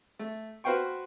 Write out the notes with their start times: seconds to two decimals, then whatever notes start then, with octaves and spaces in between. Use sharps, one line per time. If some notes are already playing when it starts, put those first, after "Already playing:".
0.19 A3
0.64 F#4 B4 C5 F5 G5 C#6